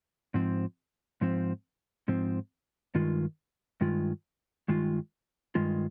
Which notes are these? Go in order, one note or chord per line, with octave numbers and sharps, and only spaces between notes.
G#2 F3 C4
G#2 F3 C4
G#2 F3 C4
G2 D#3 G#3 F4
G2 D#3 G#3 F4
G2 D#3 G#3 F4
G2 D#3 G#3 F4